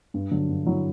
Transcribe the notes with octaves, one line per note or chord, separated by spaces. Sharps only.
G2
D3 F#3
G2
D3 F#3 E4